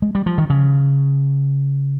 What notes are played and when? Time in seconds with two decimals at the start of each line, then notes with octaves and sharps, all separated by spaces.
0.02 G#3
0.15 G3
0.26 F3
0.38 D#3
0.50 C#3